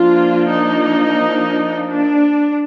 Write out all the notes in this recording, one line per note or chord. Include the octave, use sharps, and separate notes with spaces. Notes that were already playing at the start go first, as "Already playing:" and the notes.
Already playing: F3 A#3 D4 F4
D#4
D4